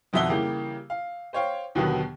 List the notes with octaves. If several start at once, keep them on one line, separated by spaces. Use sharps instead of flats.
G#1 F2 B2 E5 F#5 G7
C#3 E3 G3 A#3 G4
F5
C5 C#5 F5 G5
D#2 B2 D3 D#3 F#3 B3